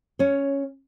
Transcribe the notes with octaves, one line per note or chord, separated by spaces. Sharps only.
C#4 C#5